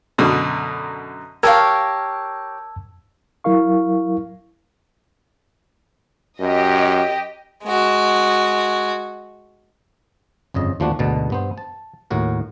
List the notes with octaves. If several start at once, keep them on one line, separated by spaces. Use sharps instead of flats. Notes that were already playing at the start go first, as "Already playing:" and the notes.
F#2 B2 D3
G4 A#4 C#5 F5 A5 E6 G#6
F#3 E4 A#4 F5 C#6
F#2 G4 D#5
G#3 F#4
G1 F2 C#3 D#5
D#2 F3 A3 D4 F#4
D2 G#2 B2 D3 A5
G2 B3 C5
A5
D#2 A2 F#4 A#4